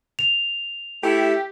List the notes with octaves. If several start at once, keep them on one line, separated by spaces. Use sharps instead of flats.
F7
A3 E4 G4